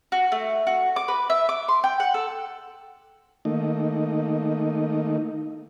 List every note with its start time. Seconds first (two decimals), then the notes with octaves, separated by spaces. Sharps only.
0.12 F#4
0.32 A3
0.67 F#4
0.96 D6
1.08 B4
1.30 E5
1.49 D6
1.68 C6
1.84 G5
2.00 F#5
2.14 A4
3.45 D#3 A3 A#3 D#4